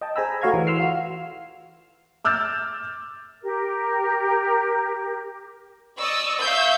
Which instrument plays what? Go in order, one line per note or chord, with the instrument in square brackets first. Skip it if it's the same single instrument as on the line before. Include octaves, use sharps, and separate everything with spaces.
[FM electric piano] D#5 G5 A5
G#4 C5 G#5 A#5 B5 E6
A3 F#4 C#5 F5 A#5 G#6
E3
C6 E6 F6 C7
F4 F#4
[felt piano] D6 E6 F6 G6 A6
[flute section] G4 A#4
[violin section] D5 D#5 C#6 D#6 E6
E5 F5 C#6 E6 G6